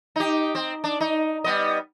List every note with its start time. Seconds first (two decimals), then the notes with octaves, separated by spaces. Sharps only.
0.16 D#4 G4
0.55 C4
0.84 D4
1.00 D#4
1.44 G3 B3 D#5